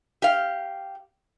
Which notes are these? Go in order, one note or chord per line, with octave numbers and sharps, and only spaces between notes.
G4 F5